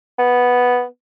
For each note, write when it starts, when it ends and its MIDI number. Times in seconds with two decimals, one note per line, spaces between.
0.18 0.84 59